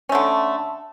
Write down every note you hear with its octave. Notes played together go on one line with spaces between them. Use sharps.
D3 A3 C#4